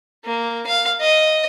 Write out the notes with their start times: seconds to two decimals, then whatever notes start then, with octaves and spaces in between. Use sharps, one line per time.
0.25 A#3
0.67 F5
1.00 D#5